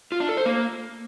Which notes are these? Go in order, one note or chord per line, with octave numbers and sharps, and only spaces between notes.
F4
D4
A4
C5
A#3